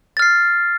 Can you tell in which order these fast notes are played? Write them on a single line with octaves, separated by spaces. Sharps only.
A6 F6 C7